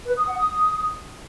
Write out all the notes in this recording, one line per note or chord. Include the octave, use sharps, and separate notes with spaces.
B4
D#6
F#5
D#6